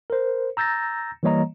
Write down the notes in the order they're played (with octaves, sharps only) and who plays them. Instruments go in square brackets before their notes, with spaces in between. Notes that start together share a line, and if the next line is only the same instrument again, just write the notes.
[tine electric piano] A#4 C5
A#5 E6 G6 A6 A#6
E3 G3 A#3 C#5 D#5 A#5